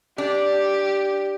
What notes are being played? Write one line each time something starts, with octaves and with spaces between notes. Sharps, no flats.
D4 G4